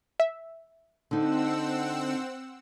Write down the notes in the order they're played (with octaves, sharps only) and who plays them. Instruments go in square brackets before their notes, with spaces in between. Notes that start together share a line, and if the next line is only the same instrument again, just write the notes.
[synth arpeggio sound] E5
[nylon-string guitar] D3 D#4 [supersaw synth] C4 F#5 E6